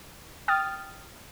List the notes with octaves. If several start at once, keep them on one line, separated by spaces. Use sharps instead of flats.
G5 D#6 F6 A6